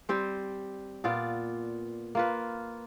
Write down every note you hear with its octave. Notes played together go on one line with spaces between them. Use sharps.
G3 C4 C5
A#2 B3 F4 D5
A#3 F4 B4